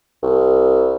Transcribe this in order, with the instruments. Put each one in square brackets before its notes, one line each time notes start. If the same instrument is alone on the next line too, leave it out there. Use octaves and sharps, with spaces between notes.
[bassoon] C2